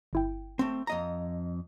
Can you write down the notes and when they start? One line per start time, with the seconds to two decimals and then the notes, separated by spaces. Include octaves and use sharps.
0.13 G1 E4 G5
0.59 A3 C4
0.87 F2 D#5 A#5